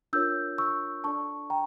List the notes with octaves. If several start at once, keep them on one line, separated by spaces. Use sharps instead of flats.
D4 F4 A#4 C#5 E6 G6
C#6 E6
D4 A4 D5 A5 C#6
G5 A#5